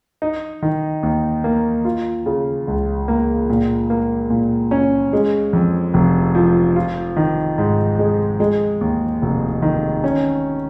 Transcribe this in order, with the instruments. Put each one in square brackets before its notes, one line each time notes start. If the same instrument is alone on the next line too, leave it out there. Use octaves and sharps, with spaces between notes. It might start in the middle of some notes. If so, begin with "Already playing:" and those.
[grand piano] D#4
D#3
D#2
A#3
F4
C#3
C#2
A#3
A#2
A#3
A#2
C#4
G#3
F2
F1
F3
F4
D#3
G#2
G#3
G#3
D#2
F1
D#3
C#4